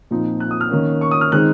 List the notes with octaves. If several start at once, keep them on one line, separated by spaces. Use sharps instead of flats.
A#2 F3 C4 D#4
F#6
D#6
F6
D#3 A#3 C#4
C#6
D#6
F6
D#3 G#3 C4 D#4 F#6